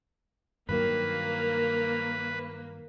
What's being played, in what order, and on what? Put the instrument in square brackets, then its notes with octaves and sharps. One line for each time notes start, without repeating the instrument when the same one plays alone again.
[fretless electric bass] G2 D#3 F#3 [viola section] A#3 [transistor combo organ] B4